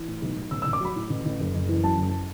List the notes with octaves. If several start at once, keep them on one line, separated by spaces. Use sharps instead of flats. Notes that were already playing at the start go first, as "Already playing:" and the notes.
Already playing: E3
A2
B1
B1
A1 E6
E6
A1
D6
F#3 B5
A2
A1
A1
F#1
F#1
E3
F#2 A5
F#1